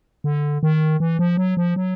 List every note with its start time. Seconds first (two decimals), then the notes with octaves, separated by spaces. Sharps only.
0.24 D3
0.63 D#3
1.00 E3
1.19 F3
1.37 F#3
1.57 F3
1.76 F#3